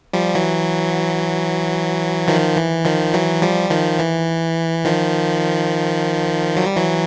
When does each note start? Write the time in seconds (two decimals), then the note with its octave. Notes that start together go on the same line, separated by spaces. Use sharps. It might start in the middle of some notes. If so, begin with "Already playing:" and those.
0.13 F3 G3
0.35 E3 F#3
2.28 D#3 F3
2.56 E3
2.85 D#3 F3
3.14 E3 F#3
3.42 F3 G3
3.71 D#3 F3
3.99 E3
4.85 D#3 F3
6.56 F#3
6.66 G3
6.77 E3 F#3